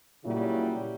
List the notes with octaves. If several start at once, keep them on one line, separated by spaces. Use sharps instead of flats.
A#2 C#3 F#3 G3 E4